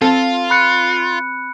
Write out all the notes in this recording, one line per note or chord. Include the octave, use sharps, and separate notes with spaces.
C4 F4 A4 A5
B5 F#6 C#7